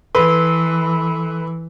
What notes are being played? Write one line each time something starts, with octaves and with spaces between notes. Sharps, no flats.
E3 A4 B4 C6